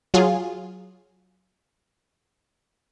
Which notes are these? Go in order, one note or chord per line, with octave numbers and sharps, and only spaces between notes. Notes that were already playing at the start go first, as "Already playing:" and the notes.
F#3 F4 G#4